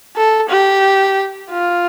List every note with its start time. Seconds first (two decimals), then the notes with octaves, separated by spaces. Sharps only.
0.16 A4
0.49 G4
1.51 F4